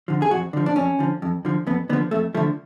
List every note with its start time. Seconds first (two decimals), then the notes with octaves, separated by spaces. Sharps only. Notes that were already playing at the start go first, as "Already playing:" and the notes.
0.08 D3 F3
0.22 G#4
0.31 F2 F#4
0.53 D3 F3
0.66 D4
0.76 F2 C#4
0.99 D3 F3
1.22 F2
1.45 D3 F3
1.67 F2 B3
1.89 D3 B3
1.93 F3
2.11 F2 A3
2.34 D3 F3 A3